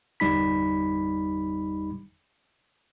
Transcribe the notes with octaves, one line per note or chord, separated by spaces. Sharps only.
G1 E2 G3 D#4 B5 B6